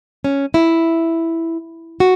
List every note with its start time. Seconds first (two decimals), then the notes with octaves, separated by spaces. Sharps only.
0.24 C#4
0.54 E4
2.00 F#4